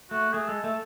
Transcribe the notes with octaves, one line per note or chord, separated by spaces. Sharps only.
A3 F#4
A3 G#4
G#3 A4
A3 A4